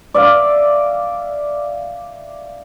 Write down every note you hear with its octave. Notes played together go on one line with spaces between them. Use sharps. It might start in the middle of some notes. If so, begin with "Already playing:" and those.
D5 E5 F5